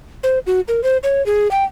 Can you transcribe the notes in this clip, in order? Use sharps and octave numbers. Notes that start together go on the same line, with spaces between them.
C5
F#4
A#4
C5
C#5
G#4
G5